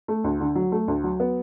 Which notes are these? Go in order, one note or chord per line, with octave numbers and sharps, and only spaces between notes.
A3
D2
D3
F#3
A3
D2
F#3
B3